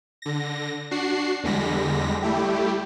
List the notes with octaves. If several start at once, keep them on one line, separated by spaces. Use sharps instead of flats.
D3 A#6
D4 F#4 C7
E2 D3 G3 G#3 A#6 B6
G3 A3 E4 G4